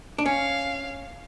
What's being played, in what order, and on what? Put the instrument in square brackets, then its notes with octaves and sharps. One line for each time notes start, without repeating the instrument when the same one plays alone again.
[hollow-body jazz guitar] D4
[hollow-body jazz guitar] C#4 [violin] F5